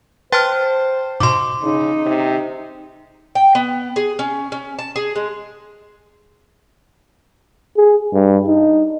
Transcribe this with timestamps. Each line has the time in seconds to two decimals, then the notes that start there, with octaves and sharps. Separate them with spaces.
0.32 B4 C5 G5 A5 C6 F6 A6
1.20 G#2 B2 C6 D6
1.63 C#3 D#4
2.06 C3
3.35 G5
3.55 B3
3.96 G#4
4.19 C#4
4.52 C#4
4.79 A5
4.96 G#4
5.16 G#3
7.77 G#4
8.13 G2
8.47 D#4